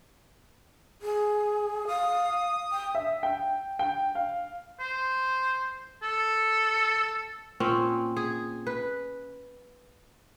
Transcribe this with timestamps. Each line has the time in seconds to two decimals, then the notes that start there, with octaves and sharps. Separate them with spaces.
1.02 G#4
1.88 F5 D#6
2.72 G5
2.95 E5
3.23 G5
3.79 G5
4.15 F5
4.80 C5
6.02 A4
7.60 A#2 C4 C#4
8.17 G#4
8.67 B4